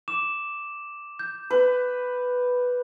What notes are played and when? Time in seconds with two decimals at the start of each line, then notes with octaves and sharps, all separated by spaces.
0.08 D6 E7
1.19 G6
1.50 B4